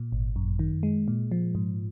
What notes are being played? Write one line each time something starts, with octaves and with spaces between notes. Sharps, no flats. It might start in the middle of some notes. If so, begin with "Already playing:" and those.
Already playing: A#2
G#1
F#2
D#3
G#3
A#2
F3
G#2